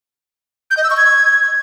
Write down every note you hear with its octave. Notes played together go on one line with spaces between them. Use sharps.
G6
D#5
E6
C#6
G#6